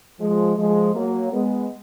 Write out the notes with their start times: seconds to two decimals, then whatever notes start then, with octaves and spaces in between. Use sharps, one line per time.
0.20 F3 G#3
0.57 F3 G#3
0.94 F#3 A#3
1.32 G#3 B3